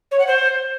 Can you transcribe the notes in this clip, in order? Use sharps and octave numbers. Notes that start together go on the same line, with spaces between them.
C#5
F#5
C5